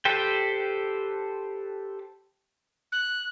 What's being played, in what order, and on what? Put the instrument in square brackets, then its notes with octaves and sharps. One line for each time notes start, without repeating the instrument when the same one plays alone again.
[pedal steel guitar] G4 A4 B4 C5 G5
[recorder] F#6